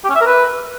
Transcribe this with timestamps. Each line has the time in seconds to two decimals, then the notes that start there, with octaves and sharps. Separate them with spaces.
0.04 G4
0.09 C#4
0.15 E5
0.20 A#4
0.26 B4